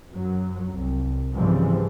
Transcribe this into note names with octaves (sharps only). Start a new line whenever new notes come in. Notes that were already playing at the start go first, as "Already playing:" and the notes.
F#2 F#3
C2
G#2 C#3 E3 F3 G3 C4